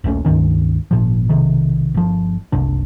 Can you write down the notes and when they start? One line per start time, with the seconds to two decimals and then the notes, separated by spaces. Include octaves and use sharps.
0.04 D#1 A#1 A3 C#4
0.25 C#2 G2 D#3 C#4
0.91 G#1 A#2 F3
1.29 B1 C3 D#3
1.94 G1 F3
2.52 F#1 C2 C3 D4